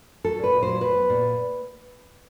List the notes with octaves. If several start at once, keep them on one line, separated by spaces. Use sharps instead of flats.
F#3 A4
A#2 B4
A#2
F#3 C5
F#3 B4
B3
A#2